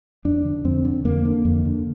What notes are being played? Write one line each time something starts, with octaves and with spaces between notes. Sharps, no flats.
F2 D4
D3
F2 C4
D3
F2 A#3
D3
F2
D3